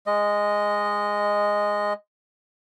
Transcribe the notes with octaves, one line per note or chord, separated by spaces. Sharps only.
G#3 D#5